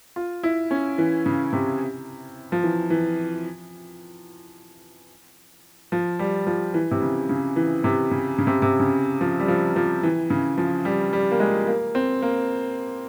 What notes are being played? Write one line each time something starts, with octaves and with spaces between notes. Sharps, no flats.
F4
E4
C#4
E3
C#3
C3
F3
E3
E3
F3
G3
F3
E3
C3
C#3
C#3
E3
C3
C#3
C#3
C3
C3
C#3
F3
G3
F3
F3
E3
C#3
F3
G3
G3
A#3
G#3
A#3
C4
A#3